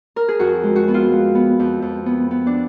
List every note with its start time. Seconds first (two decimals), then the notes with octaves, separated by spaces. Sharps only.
0.16 A#4
0.28 G#4
0.39 F2 F#4
0.63 G#3
0.76 F#4
0.88 B3
0.94 F4
1.12 G#3
1.35 B3
1.60 F2
1.82 F2
2.06 B3
2.31 B3
2.47 D4